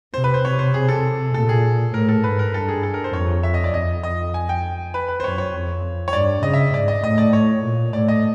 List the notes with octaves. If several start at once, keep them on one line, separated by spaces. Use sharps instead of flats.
C3 C5
B4
C5
C3 C#5
C5
G#4
A4
A#2 A4
G#4
A2 A#4
A4
G#2 B4
A#4
G2 A4
G#4
A4
A#4
C5
F2 C#5
E5
D#5
D5
F2 D#5
F2 D#5
G#5
G5
B4
B4
C5
F#2 C#5
C#5
F2
C#5
G2 D5
C#3 D#5
E5
G#2 D5
D#5
A2 D#5
D5
C#5
A#2
A2 D5
D#5